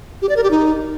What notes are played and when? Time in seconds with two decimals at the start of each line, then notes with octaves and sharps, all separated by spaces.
0.22 G4
0.29 D5
0.36 A#4
0.44 G4
0.51 D#4